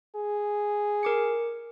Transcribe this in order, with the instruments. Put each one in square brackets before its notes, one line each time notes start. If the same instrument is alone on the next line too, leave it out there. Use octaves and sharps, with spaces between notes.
[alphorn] G#4
[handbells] A#4 D6 C#7